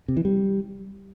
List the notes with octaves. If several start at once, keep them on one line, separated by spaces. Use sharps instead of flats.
C3
E3
G3